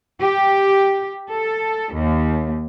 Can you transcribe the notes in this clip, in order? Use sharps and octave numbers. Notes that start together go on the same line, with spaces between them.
G4
A4
D#2